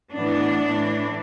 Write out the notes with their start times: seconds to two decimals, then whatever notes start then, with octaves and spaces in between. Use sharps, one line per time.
0.13 A2 E3 B3 D4
0.65 A2 E3 A3